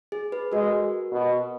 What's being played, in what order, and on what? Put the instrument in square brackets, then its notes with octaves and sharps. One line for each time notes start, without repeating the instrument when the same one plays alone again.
[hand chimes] G#4
G#4 B4
[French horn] G#3 [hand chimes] F#4 A#4
[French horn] B2